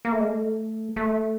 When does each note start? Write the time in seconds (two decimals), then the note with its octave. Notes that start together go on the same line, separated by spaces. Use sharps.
0.05 A#3
0.12 A3
0.20 G#3
0.27 A3
0.96 A3